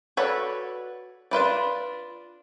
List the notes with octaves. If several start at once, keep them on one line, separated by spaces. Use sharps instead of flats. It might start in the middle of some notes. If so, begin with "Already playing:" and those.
F#4 A4 B4 C#5 D5
D4 F4 B4 D5